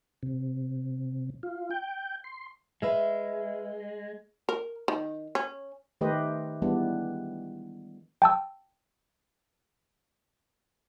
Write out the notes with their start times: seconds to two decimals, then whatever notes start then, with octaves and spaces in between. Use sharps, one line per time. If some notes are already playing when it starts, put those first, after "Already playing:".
0.23 C3
1.43 F4
1.71 G5
2.24 C6
2.82 G#3 B4 E5 F5
4.49 A#4
4.88 D#3
5.35 C#4
6.01 D#3 A3 G4 B4 C5 D#5
6.62 E3 G3 G#3 B3 D4
8.22 G5 A5 E6